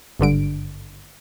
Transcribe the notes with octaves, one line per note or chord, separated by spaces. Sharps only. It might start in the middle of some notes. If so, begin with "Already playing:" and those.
G#1 G2 D3 D7